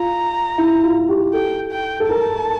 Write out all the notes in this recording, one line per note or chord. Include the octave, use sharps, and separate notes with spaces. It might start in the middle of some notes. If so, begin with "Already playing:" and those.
Already playing: F4 A#5
E4
F4
G4
A4 G5
G5
A4
A#4 A5